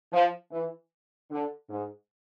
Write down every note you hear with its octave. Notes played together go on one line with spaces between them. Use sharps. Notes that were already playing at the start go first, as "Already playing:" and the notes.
F3
E3
D3
G#2